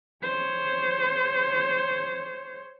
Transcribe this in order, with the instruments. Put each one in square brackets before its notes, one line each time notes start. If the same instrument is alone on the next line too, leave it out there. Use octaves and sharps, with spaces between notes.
[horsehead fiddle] C5 C#5